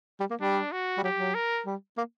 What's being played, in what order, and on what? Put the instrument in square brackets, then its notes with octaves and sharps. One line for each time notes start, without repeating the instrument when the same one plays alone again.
[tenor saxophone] G3
A#3
[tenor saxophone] G3 [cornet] D4
[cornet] F#4
[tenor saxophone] G3
[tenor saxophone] F#3 [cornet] G4
[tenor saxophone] F#3
[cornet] A#4
[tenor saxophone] G3
A#3